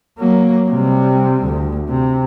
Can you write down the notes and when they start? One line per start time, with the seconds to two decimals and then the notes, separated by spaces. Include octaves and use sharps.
0.19 F#3 A#3
0.69 C3 G3
1.44 D2
1.89 C3